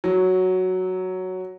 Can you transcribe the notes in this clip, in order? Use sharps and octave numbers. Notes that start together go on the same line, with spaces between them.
F#3